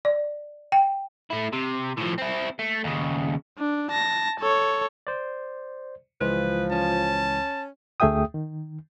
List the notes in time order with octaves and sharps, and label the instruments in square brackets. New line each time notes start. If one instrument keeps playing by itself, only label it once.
[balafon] D5
G5
[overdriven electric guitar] A3 E4
C3
A2 F3
C4 E4
A3
D#2 C#3
[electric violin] D4
A5 A#6
A4 C#5
[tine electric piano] C5 D5
[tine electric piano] C#2 E3 G#3 [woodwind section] F3 [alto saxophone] B4
[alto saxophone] C#4 [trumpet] A5
[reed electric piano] D2 A3 G#4 E5 G5 D#6
D#3